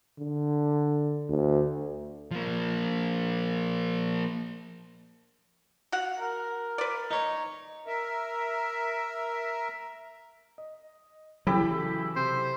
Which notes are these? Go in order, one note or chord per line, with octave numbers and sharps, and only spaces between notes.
D3
D2
F3 A#3
F#4 F5 F#5
A#4
B4 D5
D#4 C#5
A#4 E5
D#5
C#3 E3 F#3 E4 G4 A4
C3 C5